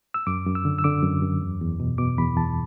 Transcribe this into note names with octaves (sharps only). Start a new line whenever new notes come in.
E6
F#2 D6
F#2
E6
D3
E6
D3 D6
F#2
F#2
E2
E2
B2
B2 D6
E2 B5
E2 A5